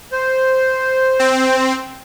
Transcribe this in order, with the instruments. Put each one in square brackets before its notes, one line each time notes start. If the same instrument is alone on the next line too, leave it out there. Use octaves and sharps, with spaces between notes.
[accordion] C5
[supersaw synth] C4